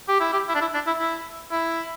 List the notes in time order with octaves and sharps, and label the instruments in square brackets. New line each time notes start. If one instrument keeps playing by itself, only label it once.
[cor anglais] G4
E4
G4
E4
D4
E4
D4
E4
E4
E4